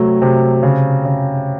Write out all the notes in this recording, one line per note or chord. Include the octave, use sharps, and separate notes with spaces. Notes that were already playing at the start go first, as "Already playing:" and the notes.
Already playing: C3 F#3 A3
C3
C#3
C#3